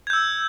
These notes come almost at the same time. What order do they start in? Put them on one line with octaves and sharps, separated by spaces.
G#6 G6 E6